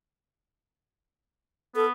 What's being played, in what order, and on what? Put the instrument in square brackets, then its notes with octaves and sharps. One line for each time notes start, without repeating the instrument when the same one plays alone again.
[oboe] B3 [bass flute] A4